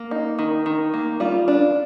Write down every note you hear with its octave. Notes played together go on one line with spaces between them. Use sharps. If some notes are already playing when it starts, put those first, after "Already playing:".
Already playing: A#3
D#4
D#3
D#3
A#3
G3 F4
D4